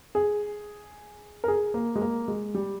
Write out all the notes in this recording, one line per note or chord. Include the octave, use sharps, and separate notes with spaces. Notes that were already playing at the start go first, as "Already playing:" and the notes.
G#4
A#4
G#4
A#3
G#3
A#3
G#3
G3